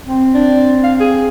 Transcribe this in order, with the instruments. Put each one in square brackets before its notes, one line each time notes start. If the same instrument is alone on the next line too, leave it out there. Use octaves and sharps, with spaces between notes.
[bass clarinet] C4
[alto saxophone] D4
F5
G#4